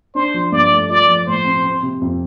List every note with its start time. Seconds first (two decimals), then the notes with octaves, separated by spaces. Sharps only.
0.15 D4 C5
0.34 F3
0.52 G2 D5
0.71 A3
0.89 F4 D5
1.08 F3
1.26 A2 C5
1.45 C4
1.63 C4
1.83 C3
2.01 F2